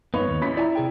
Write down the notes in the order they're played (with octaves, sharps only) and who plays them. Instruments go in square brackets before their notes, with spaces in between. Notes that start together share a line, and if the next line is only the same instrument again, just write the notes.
[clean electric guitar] G2 B3 [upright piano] D#4 B4 C#5
[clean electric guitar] D#2
[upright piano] A1 B5 B6 [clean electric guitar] C#4
[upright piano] E4 [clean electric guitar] D5 G#5 A#5
[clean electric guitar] C3 G#4 G5